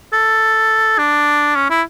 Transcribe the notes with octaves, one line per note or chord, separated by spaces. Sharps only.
A4
D4
C#4
E4